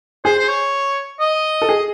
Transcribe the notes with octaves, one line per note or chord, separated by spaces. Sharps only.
G#4 C5
C5
C#5
D#5
A4
G#4